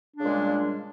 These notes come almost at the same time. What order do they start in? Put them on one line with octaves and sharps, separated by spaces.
D4 C#3 G#3 A#2 G3